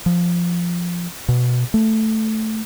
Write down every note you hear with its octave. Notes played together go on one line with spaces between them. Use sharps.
F3
B2
A3